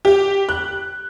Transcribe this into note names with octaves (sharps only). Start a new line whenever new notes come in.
G4
F#6